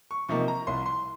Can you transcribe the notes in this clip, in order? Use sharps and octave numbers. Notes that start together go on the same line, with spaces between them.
C#6
C3 F3 A#3 D#4 C#6
A#5
C2 C6
C6